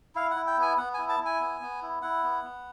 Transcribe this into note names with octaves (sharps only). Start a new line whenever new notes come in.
E4 F5
F#5
E4
G5
B3 G#5
B3 F#5
E4 G#5
A5
E4
G#5
B3
B3
E4
E4 F#5
B3
B3